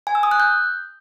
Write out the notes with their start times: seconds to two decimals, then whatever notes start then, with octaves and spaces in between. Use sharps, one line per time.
0.07 G#5
0.15 E6
0.23 D#6
0.31 F#6
0.40 G6